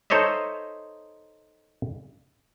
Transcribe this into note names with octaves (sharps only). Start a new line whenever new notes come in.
D#4 A4 C5 C#5 D#5 E5